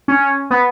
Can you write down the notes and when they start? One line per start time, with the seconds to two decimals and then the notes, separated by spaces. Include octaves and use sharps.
0.08 C#4
0.51 B3